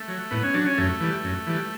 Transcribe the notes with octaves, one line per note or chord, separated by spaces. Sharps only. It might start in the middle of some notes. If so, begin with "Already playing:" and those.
Already playing: A3
F#3
A2 B3
C#4
F#3 D4
C#4
F#2 A3
E3 G3
F#2
E3 G3